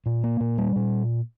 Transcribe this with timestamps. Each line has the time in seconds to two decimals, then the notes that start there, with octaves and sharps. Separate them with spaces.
0.06 A#2
0.24 A#3
0.40 A#2
0.58 G3
0.76 A#2